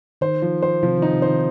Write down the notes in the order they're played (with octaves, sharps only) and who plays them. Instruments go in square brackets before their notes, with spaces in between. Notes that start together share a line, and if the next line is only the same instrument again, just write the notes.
[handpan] D#3 [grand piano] C5
[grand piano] F3
C5
[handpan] C3 [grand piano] F3
[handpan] D#3
[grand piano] D#4
[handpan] C3
[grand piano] C5
[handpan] D#3